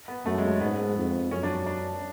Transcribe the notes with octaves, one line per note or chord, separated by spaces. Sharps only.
B3
F#2 A3
G#3
G#2 B3
F2
F#2 C#4
D4
D4